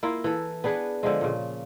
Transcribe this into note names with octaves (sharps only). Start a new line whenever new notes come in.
A#3 E4 F4
E3 A4
B3 D4 G#4 B4
D3 F3 G#3
A#2 C#3